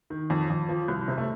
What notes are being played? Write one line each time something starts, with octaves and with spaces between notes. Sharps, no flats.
D#3
F2
F2
F3
C2
C3
A3